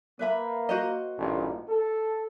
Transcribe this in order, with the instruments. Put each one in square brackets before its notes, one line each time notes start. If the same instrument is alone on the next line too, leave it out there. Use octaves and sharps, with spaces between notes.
[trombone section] A#3 [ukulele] B4 E5 B5
[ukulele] F#4 C5 D#5
[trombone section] A1 G2 A#2
A4